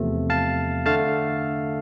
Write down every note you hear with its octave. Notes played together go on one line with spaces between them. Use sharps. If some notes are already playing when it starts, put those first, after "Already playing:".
Already playing: E2 C3 F3 A3
F5 A5
D3 A3 F5 A5